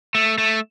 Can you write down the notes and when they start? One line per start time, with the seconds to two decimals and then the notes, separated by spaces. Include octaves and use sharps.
0.15 A3
0.38 A3